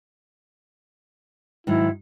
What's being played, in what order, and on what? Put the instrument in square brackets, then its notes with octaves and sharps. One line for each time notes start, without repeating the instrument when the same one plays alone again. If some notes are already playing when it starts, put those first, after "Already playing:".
[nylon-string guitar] G#2 D#3 F#3 [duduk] E4